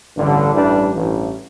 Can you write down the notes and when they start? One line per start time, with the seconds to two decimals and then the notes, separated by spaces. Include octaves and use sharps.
0.16 A1 G2 D3 G3
0.54 A1 G2 E3 G3 D4
0.93 A1 G2 E3